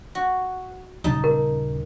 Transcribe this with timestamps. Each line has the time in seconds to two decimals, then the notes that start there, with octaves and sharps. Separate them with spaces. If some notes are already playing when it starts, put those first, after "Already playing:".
0.15 F#4
1.04 D#1 C#3 D#4 A5
1.24 A#4